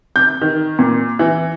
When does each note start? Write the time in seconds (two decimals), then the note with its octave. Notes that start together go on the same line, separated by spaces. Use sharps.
0.16 G6
0.41 D#3
0.79 A#2
1.19 E3